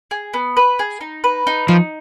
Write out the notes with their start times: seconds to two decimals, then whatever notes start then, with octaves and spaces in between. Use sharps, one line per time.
0.11 G#4
0.34 B3
0.57 B4
0.79 G#4
1.01 D#4
1.24 B4
1.47 D#4
1.68 F3 D#4